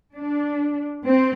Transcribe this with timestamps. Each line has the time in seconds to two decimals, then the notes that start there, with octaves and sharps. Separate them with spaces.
0.15 D4
1.05 C4